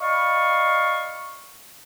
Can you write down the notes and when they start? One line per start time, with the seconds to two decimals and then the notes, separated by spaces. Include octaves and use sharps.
0.01 D5 D#5 F5 B5 C#6